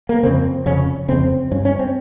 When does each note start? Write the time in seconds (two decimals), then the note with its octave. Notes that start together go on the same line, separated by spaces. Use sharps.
0.09 A#3
0.23 F2 C#3 C4
0.66 F2 C#3 C#4
1.08 F2 C#3 C4
1.51 G2 C#4
1.65 C#4
1.79 C4